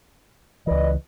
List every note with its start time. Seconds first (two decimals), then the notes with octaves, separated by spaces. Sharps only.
0.67 C#2 E3 B4 D5 D#5